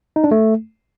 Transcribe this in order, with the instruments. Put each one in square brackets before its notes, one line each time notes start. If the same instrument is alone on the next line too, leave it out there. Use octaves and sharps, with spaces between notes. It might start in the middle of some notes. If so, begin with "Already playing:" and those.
[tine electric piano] D#4
D4
A3